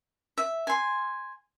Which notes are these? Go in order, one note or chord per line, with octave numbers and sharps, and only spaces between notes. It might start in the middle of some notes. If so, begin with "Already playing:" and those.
E5
G#5 C6